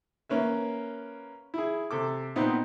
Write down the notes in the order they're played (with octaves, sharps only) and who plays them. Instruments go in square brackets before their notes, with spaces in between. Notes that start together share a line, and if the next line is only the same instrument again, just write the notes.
[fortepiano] A#3 C#4 B4 E5
E4 G#4
C3 A4 D6
A#2 B3 C4 D#4